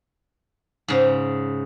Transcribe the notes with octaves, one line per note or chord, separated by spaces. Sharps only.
G#2 C#3